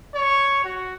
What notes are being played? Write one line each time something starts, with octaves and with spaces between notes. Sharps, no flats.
C#5
F#4